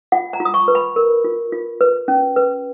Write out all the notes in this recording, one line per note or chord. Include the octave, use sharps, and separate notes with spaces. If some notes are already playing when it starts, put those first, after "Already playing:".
F4 F#5
A#5
F4
D#6
C#6
B4
B5
A#4
F4
F4
B4
C#4
B4